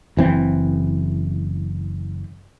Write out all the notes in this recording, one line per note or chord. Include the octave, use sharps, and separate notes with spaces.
F#1 E3 C4